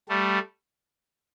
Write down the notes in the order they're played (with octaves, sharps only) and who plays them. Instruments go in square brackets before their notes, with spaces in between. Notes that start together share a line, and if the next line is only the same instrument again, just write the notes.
[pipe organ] G3 A3